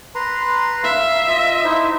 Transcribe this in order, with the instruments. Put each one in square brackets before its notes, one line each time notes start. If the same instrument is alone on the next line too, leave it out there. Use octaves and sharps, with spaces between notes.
[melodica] B4 A#5 C6
[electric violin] E5 [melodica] F5
[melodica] F4 D#5
D#4 E4 C5